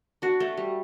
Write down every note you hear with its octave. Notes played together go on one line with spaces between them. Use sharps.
D4 F#4
A3
G3